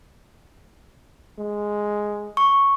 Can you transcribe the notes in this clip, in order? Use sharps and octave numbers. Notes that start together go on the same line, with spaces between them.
G#3
C#6